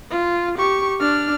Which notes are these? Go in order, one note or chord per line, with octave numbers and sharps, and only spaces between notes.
F4
G4 C#6
D4 F6